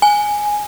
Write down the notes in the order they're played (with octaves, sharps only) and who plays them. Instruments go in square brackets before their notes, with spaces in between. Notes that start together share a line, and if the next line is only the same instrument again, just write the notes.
[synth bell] G#5